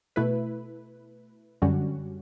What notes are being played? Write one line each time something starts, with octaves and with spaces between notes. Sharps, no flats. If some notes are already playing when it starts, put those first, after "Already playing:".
B2 A3 E4 B4
F#2 D3 G3 C#4 F#4